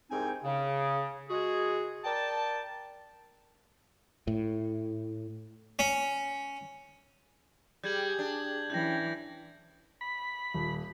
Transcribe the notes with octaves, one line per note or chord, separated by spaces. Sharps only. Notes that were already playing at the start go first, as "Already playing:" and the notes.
C2 G#2 C4 D#4 G5 G#5
C#3
G#3 F#4 G#4
A#4 D5 G5 A5
A2
C#4
G3 G4 G#4 G6 G#6 F#7
D4
E3 C#4 G5 G6 G#6 A#6
B5
D#1